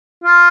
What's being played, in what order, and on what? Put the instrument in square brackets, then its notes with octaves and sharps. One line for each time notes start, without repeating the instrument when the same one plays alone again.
[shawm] F4